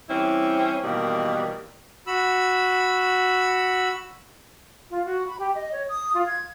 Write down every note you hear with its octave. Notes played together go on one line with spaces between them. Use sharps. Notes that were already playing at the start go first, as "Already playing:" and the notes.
E3 G3 C4 C#4 E4
B2 D#3 E3 G3 A#3
F#4 B5 E6
F4
F#4
B5
G4
D#5
C#5
D#6
F4
G#6